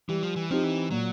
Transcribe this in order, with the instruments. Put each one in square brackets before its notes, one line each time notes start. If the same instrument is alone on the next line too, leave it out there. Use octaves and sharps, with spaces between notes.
[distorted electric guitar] E3 [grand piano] G3
[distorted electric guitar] F3
E3
[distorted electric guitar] F3 [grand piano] C4 D#4 G4
[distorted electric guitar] E3
[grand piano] A#2 [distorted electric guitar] F#3